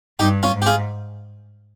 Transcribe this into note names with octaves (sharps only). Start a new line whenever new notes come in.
G2 D#4 G4
C#4 F4
G#2
G4
F4 G#4